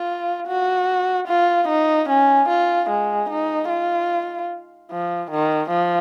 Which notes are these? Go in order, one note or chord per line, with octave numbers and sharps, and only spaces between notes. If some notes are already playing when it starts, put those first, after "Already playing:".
Already playing: F4
F#4
F4
D#4
C#4
F4
G#3
D#4
F4
F3
D#3
F3